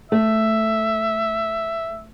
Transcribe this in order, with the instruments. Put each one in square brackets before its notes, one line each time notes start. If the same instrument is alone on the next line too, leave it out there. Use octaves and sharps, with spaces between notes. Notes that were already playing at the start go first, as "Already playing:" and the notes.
[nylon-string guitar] A3 [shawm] E5